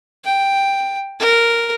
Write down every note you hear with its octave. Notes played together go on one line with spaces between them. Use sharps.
G5
A#4